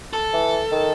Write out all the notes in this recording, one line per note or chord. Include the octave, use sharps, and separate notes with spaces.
A4
E3
D#3